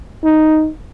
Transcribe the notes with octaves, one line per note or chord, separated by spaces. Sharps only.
D#4